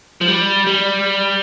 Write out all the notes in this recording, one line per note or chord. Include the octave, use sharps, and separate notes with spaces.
F3
G3
G3